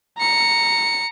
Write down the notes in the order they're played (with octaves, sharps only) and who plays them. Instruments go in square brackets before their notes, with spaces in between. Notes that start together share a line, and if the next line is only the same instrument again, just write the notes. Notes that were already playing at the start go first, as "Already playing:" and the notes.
[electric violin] A#5 C#7